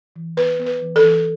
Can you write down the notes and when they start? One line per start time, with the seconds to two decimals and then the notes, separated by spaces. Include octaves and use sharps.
0.16 E3
0.37 B3 B4
0.59 B3
0.66 B4
0.81 E3
0.96 A4
1.03 E3